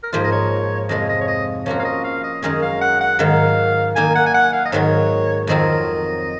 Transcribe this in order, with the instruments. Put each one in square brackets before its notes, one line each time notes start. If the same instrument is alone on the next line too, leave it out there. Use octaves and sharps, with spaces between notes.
[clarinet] A#4
[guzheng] G#2 F3 A#3 F4 [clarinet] C5
[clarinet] D#5
C#5
[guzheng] F2 C3 F3 G#3 [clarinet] D#5
[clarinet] D#5
C#5
D#5
[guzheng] F3 A#3 C#4 F#4 [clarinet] C#5
[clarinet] F5
D#5
F5
D#5
[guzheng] F#2 D#3 G#3 C#4 [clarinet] D#5
[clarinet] F5
F#5
F#5
[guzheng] G#2 D#3 F#3 [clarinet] F5
[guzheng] D#3 A#3 D#4 [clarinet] G#5
[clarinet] F#5
G#5
F#5
F5
D#5
[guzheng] G#2 D#3 F#3 [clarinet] C#5
[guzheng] F2 D#3 F#3 C4 F4 [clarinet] D#5